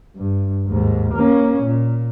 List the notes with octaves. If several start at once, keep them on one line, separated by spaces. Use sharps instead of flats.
G2
D#2 G#2
A#3 C#4
A#2